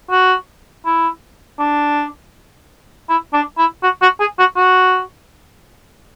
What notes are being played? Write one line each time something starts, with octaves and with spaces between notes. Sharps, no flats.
F#4
E4
D4
E4
D4
E4
F#4
F#4
G#4
F#4
F#4